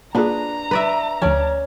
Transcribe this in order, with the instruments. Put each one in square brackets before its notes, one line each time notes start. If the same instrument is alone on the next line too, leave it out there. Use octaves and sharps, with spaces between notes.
[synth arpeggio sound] A#3 F4 G#4 [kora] D4 B4 [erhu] A#5
[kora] B4 D5 E5
[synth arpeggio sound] D2 F3 [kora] C#4 D5